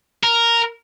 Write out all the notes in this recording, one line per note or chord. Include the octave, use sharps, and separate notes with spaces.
A#4